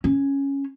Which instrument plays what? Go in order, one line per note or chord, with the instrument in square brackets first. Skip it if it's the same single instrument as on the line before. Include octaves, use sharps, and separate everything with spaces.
[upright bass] C#4